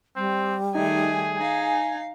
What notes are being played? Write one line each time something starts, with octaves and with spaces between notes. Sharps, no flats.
G3 C4
D#3 A3 D#4 G#4 G#5
D#4 F5 G#5